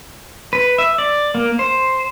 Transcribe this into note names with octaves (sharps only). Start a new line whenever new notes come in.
B4
E5
D5
A#3
C5